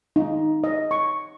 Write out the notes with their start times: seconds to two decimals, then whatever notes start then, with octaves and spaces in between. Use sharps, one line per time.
0.16 D#4
0.64 D#5
0.91 C#6